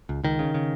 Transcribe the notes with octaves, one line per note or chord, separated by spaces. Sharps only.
C#2
C#2 D#3
C#3
C#3